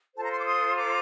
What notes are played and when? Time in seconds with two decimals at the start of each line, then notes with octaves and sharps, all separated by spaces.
0.15 F4 A4 C5 A5
0.24 A#5
0.31 C6
0.37 D6
0.45 C6 D#6
0.76 A#5 D6